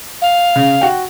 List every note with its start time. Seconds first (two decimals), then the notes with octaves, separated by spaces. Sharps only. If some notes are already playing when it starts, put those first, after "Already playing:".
0.22 F5
0.56 C#3
0.81 F#4 G5